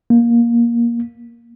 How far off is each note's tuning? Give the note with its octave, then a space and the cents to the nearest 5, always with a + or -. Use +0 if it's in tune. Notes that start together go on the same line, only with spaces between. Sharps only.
A#3 +15